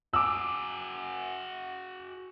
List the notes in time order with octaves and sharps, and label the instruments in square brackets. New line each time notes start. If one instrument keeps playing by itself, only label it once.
[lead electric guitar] F#4 G#4 [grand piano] D6 E6